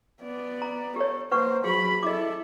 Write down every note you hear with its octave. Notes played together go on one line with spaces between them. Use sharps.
B3 D5
A#5
G4 A4 C#5
A#3 B4 C5 F#5 C#6
F#3 G4 G#4 B5
E4 A4 D#5 D6